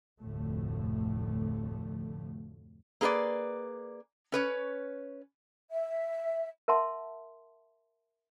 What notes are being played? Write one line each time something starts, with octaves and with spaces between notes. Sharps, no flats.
F1 D2 A2 D3 F3 A3
A#3 G#4 A#4 B4 D5
C#4 B4 C#5
E5
A#4 E5 F#5 A5 C6